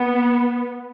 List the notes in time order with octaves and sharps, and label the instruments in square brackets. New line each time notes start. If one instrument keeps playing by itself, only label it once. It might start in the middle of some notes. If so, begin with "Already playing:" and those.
Already playing: [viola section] B3